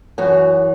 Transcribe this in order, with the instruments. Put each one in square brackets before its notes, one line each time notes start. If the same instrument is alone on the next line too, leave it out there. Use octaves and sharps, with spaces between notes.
[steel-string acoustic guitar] F#2 E3 F#4